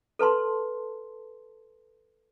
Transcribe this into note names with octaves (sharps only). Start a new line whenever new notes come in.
A4 B4 A5 C6